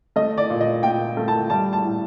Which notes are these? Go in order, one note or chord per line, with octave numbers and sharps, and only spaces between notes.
A3 D#5
D5
A#2
D#5
A#2 G5
A3
A5
G3 A5
A5
A2